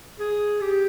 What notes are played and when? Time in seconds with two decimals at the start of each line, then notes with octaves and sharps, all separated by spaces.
0.19 G#4
0.61 G4